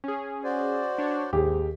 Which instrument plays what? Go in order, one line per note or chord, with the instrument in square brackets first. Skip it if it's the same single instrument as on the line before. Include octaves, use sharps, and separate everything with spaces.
[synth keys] C#4 G#4
[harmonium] F#4 C5 D5
[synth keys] D4 C#5
[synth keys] D#2 [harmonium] G#2 [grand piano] G4 G#4